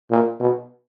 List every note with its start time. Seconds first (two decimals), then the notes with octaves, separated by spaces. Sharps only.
0.10 A#2
0.40 B2